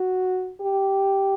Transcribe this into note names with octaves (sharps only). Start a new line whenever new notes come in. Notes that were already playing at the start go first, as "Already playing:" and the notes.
Already playing: F#4
G4